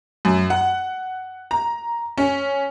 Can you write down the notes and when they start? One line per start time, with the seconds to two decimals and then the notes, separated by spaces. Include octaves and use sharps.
0.25 F#2
0.50 F#5
1.51 A#5
2.18 C#4